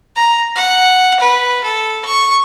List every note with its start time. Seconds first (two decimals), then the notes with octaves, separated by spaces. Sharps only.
0.16 A#5
0.56 F#5
1.20 B4
1.64 A4
2.05 C#6